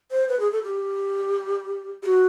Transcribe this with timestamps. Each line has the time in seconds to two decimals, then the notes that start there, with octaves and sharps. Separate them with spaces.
0.11 C5
0.29 B4
0.40 G#4
0.52 A4
0.64 G4
2.03 G4
2.06 F#4